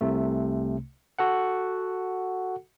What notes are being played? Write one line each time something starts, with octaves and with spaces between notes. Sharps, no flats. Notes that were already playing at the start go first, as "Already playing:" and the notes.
C2 C3 A3
F#4 A4 F#5